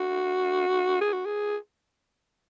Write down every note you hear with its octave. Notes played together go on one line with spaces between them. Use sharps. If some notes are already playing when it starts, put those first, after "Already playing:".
Already playing: F#4
G#4
F#4
G#4